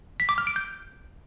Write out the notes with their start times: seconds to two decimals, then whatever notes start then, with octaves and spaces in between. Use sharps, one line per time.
0.20 B6
0.29 D6
0.38 F6
0.47 D7
0.56 G6